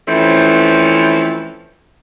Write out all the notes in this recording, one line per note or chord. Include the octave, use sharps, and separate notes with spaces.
E3 F3 A3 C4 C#4 E4